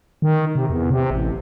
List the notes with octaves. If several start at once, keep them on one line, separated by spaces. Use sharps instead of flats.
D#3
C3
E2
C3
A1